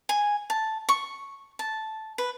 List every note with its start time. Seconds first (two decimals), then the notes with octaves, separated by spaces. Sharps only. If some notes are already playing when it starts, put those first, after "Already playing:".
0.09 G#5
0.50 A5
0.89 C#6
1.59 A5
2.18 B4